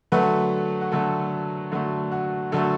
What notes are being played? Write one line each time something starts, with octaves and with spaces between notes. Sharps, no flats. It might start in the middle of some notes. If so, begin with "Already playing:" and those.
D3 F#3 A3 F#4 B4
F#4
D3 F#3 A3 A4
D3 F#3 A3 F#4
F#4
D3 F#3 A3 A4